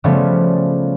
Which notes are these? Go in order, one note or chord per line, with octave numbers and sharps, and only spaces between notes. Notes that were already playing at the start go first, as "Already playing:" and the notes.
C#3 F3 G3 A3 B3 C#4